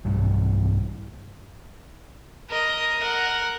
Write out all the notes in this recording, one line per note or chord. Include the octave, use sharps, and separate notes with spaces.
B1 G2 E3 G3
A#4 D#5
A#4 F#5